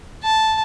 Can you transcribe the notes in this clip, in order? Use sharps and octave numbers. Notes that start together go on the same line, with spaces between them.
A5